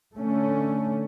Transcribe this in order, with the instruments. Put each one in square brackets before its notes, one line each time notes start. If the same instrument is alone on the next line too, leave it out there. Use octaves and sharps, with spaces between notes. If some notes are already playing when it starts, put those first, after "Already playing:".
[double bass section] D3 A3 C#4